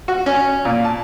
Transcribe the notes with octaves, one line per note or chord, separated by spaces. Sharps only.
F#4
C#4
A#2
A5